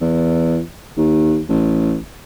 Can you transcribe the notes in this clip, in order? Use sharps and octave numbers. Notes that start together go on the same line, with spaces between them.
E2
D#2
A1